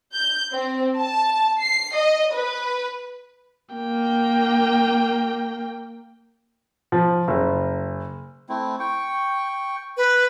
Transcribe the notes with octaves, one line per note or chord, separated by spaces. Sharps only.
G6
C4
A5
C7
D#5
B4
A#3 G5
F3
F#1
A3 C4 E4
G5 C#6
B4